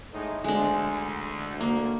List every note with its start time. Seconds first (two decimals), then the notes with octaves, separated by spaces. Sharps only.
0.13 A2 G#3 D#4
0.44 D2 G#3 D4
1.61 A#3